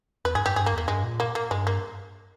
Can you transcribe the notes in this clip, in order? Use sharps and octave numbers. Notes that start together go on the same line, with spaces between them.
E2 B4
G2 G#4
G2 G4
G2 G#4
A#3
E2
A#3
G2 G#3
A#2
A#3
A#3
G2 G#3
A#3